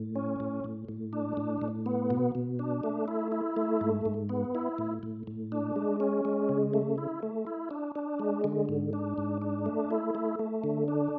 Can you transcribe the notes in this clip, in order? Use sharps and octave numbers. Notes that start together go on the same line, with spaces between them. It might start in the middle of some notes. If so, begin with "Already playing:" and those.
Already playing: A2
C#4
A2
A2
A2
D4
A2
A2
B3
B2
B2
D4
A3
E4
E4
A3
G#2
G#2
B3
E4
A2
A2
A2
D4
G#3
C#4
G#3
C#3
A3
E4
A3
E4
D4
D4
G#3
D3
G#2
D4
G#2
D4
A3
E4
A3
A3
D3
D4